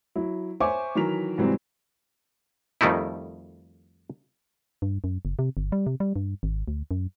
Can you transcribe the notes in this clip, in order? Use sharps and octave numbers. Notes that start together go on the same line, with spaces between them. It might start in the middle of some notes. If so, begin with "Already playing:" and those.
F#3 E4
C5 C#5 E5 G#5 C#6 D6
D#3 E3 F#3 A#4 B6 F7
G#2 C3 E3 F#3 G3 C4
F2 D#3 G3 A3 D#4 E4
G2
F#2
F#1
C3
G1
G3
C3
G3
G2
G#1
D2
F#2